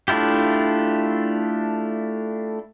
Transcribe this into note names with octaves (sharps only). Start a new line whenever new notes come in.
A3 D4 E4 F4 G4